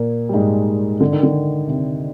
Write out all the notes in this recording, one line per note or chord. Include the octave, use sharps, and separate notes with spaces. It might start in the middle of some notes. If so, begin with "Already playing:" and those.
Already playing: A#2 A#3
G3
G#2 G#3
D3
D#3
D3
C3